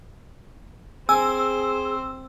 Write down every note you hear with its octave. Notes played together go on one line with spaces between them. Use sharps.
C4 G#4 C5 G#5 E6